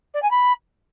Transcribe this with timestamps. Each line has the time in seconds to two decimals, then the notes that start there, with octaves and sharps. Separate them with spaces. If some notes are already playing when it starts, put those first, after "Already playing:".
0.14 D5
0.22 G#5
0.31 B5